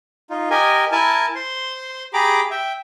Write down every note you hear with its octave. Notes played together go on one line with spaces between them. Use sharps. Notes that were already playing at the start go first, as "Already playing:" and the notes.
D#4 F4
G4 A#4 D#5 G#5
E4 A#4 G#5 A5
C5 C6
G4 G#4 A#5 B5 D6
E5 G5